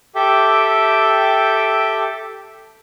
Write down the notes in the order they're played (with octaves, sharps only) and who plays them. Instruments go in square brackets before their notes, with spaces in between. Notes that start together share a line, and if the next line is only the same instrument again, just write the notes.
[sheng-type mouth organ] G4 A4 E5 G5 D6